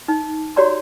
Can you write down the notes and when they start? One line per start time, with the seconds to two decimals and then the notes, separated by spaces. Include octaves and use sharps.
0.08 D#4
0.56 F#4 G4 C#5 D5 A#5 C6